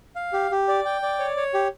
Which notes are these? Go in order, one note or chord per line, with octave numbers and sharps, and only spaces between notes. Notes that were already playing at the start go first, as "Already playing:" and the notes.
F5
G4
G4
D5
G5
D5
C#5
C#5
G4